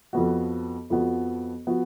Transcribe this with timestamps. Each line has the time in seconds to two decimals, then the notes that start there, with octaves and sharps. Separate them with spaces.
0.13 F2 F3 B3 F#4
0.90 F2 F3 B3 F#4
1.67 F3 B3 F#4